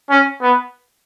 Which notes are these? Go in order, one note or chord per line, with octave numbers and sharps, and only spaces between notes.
C#4
B3